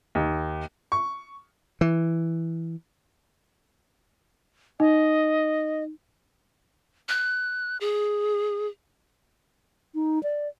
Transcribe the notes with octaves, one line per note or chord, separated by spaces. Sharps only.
D#2
C#6
E3
D#4 D#5
F#6
G#4
D#4
D5